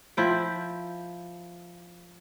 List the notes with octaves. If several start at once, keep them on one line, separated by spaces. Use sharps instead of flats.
F3 E4 G5